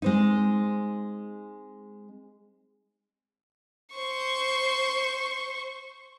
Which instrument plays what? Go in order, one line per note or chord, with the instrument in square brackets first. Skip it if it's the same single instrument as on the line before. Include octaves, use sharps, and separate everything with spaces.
[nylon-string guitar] G#3 C4 D#4
[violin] C5 C#6